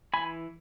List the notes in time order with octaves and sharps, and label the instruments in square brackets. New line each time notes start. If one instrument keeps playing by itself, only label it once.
[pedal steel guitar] E3 G#5 B5